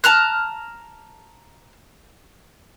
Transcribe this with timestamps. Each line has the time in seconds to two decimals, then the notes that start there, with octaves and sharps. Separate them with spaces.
0.04 A5 A#5 F6 F#6